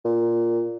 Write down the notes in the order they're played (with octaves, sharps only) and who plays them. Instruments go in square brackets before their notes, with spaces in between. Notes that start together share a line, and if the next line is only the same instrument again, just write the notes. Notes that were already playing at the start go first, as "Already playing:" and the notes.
[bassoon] A#2